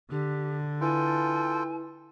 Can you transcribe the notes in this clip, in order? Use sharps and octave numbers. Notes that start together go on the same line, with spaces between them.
D3 G4
E4 F4 A4 B4 G5 G#5